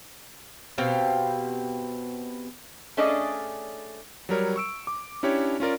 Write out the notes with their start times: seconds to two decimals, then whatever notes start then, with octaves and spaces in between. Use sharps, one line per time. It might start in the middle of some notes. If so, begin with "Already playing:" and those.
0.78 B2 C4 G4 F5
2.97 A3 C#4 D4 G#4 D5 D#5
4.29 F#3 G3 A#4 C#5
4.56 C#6 E6 D7
4.87 D6
5.23 C#4 D4 E4 G4 C#5
5.60 C#4 F4 A#4 D5